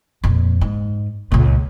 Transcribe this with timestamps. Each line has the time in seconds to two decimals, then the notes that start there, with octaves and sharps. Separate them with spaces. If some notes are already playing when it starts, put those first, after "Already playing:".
0.24 F2 A#2
0.61 G#2
1.32 C#2 A#2